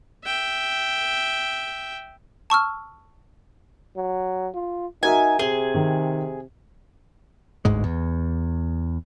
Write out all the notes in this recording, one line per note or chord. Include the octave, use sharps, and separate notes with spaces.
E5 G5
A5 C#6 E6 F6
F#3
F4
D#4 F#4 A#4 E5 G#5
C3 G#4 G7
D#3
G1 D2 G#2 G#3
E2